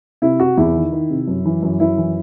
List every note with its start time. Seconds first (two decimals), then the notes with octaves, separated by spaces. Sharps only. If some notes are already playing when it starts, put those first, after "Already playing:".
0.22 C3 E4
0.40 C3 F#4
0.57 E2 E4
0.75 D#3
0.92 D#3
1.10 C3
1.28 F#2
1.45 E3
1.62 F#2
1.80 F#2 E4
1.98 E3